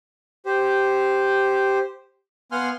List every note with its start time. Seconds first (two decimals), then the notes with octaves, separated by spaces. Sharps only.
0.46 G4 C5
2.52 B3 F5 F#5 G#5 C6 F6